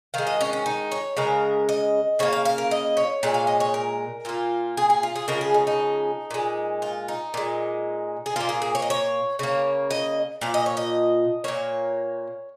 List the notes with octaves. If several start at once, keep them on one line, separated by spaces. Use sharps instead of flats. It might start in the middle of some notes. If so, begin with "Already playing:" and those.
D#3 G#3 F5
D#5
C#4
C#4
D#4
C#5
C#3 G#3 A#4
D#5
C#3 A#3 C#5
F5
F5
A#4
D#5
C#5
A#2 G#3
F5
D#5
C#5
A#4
A#2 A#3 F4
G#4
G#4
F4
G#4
C#3 F3 G#3 A#4
G#4
D#4
D#4
A#2 G#3
F4
D#4
A#2 G#3
G#4
A#2 A#3 F4
G#4
G#4
C#5
D#5
C#5
C#3 A#3 C#5
D#5
A#2 F3 F5
D#5
C#5
D#5
A#2 A#3 C#5